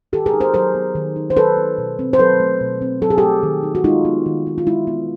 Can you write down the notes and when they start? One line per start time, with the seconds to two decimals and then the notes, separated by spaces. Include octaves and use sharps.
0.13 D#3 G4 A4
0.26 G#4 A#4
0.34 D#4
0.40 A#4 C5
0.54 F#3 A#4 C5
0.75 B3
0.95 D#3
1.16 D#4
1.30 C5
1.37 F#3 A4 B4
1.57 B3
1.78 B2
1.99 C4
2.13 C5
2.19 F#3 A4 B4
2.40 A3
2.60 B2
2.82 C4
3.02 F#3 A4
3.10 G#4
3.18 A3 G4 A4
3.43 D#3
3.63 D#4
3.75 F#4
3.84 G#3 D#4 F4
4.05 B3
4.26 D#3
4.47 D#4
4.58 F4
4.66 G#3 E4
4.87 B3